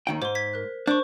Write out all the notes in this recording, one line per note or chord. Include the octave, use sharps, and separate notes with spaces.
D#2 D#3 G5
G#2 C5 C6
G#6 B6
A#4 F#6
D4 C5 C#6